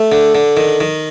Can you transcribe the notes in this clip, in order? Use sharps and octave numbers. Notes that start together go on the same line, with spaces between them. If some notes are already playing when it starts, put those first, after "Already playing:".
Already playing: A3
D3
D3
D#3
D#3